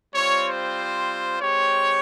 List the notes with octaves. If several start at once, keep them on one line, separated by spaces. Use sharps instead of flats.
G3 C4 F4 C#5
C5
G#3 C4 G4 C#5